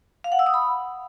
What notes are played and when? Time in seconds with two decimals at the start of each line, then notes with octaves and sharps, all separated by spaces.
0.24 F5
0.32 F#5
0.39 E6
0.46 D#6
0.54 B5